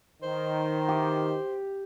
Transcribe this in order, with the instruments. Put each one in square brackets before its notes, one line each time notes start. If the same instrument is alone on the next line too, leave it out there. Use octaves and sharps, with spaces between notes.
[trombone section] D#3 [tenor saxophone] C5
[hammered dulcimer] G4